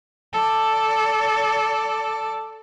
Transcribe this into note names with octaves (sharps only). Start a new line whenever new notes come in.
A4 D5